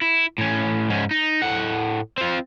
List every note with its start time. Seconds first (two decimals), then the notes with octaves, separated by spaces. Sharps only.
0.01 E4
0.38 A2 C#4
0.90 G#2 C#4
1.11 D#4
1.42 A2 F#5
2.18 C4 F4